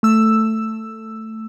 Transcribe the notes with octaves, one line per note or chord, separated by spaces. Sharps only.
A3 E6